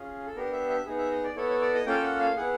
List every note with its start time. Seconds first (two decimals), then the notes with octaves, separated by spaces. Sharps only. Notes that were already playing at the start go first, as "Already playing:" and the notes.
Already playing: C#4 F4 G#4
0.27 A4
0.36 B3 D4 G4 A#4
0.52 E5
0.69 E5
0.86 B3 D#4 G#4
0.98 E5
1.11 D#5
1.24 D5
1.36 B3 E4 A4 C#5
1.49 C#5
1.61 D5
1.74 D#5
1.86 A#3 C#4 F4 A4 G5
2.03 F#5
2.20 F5
2.36 B3 E4 G#4 F#5